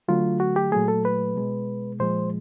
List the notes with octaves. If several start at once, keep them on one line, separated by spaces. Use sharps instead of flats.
D3 F#3 A3 F4
F#4
G4
A#2 F#3 A3 G#4
A4
B4
B2 G#3
A#2 F3 G#3 C5